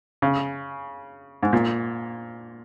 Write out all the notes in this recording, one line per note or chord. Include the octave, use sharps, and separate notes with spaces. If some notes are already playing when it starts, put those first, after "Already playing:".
C#3
G#2
A#2